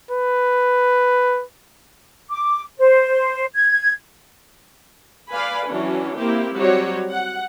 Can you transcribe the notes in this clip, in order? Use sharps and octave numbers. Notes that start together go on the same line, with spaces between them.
B4
D6
C5
G#6
B4 D5 F5 G#5 B5
E3 F#3 C#4 D4
A#3 C4 E4 G4
F#3 G3 C4 F#4 G4 C#5
F#5